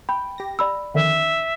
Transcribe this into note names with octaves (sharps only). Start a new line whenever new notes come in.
G5 B5
G4 A#6
D5 B5 E6
F2 D3 D#3 E5